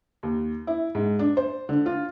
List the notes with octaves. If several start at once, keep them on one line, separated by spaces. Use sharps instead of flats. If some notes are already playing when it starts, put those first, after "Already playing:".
D#2
E4
G#2
D4
C5
D3
F4